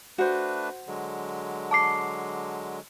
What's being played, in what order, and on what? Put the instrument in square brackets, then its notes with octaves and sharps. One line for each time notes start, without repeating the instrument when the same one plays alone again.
[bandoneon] A3 D4 B4 [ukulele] F#4 C5
[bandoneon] D3 F#3 G#3
[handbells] A5 D6 C7